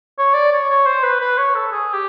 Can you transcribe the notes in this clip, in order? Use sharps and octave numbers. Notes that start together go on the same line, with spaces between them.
C#5
D5
C#5
C#5
C5
B4
B4
C#5
A4
G#4
G4